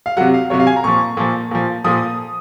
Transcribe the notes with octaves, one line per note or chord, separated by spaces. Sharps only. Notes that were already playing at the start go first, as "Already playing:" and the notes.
F5
C3 F#3 F#5
F5
C3 F#3 C#5
F5
G#5
A#5
A#2 F3 C#6
A#2 F3
A#2 F3
A#2 F3 D#6